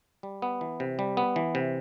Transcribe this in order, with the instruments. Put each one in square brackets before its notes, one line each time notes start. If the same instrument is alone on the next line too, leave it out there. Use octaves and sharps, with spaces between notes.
[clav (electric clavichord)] G3
B3
E3
C3
G3
B3
E3
C3